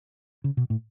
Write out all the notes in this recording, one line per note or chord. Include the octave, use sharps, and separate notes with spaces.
C#3
B2
A2